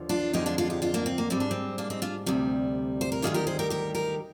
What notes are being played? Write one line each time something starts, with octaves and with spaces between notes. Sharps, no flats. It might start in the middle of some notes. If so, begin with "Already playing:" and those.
Already playing: D#2 D3 F3
D4 F4
F2 D3 F3 G#3 D#4 G4
D4 F4
D4 F4
D#4 G4
D4 F4
A#3 D4
C4
A#3
G#2 G3 C4
D4
C4
A#3 D4
C4 D#4
D4 F4
D2 C3 G3
C5
A#4
D2 C3 D#3 G3 F4 G#4
G4 A#4
G#4 C5
G4 A#4
G4 A#4
G4 A#4